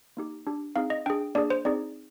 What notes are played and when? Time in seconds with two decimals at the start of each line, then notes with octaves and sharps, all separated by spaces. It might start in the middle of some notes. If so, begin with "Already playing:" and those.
0.17 A#3 D#4 G4
0.47 D4 G4
0.76 C4 D#4 G#4 F5
0.90 D#5
1.06 D4 G#4 G5
1.35 A#3 D4 G#4 D5
1.50 C5
1.65 C4 D#4 G#4 D5